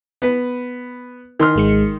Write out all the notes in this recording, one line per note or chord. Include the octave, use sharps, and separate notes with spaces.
B3 B4
D#3 C6 F6
G#1 G#3 C#7